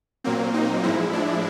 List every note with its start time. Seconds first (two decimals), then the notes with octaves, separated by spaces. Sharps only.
0.24 A#2 F#3 A#3 C4
0.54 D#4
0.83 A2 F3 G#3 E4
1.13 D4